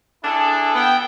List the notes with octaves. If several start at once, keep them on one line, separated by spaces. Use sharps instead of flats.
D4 E4 G#4 A4
B3 G5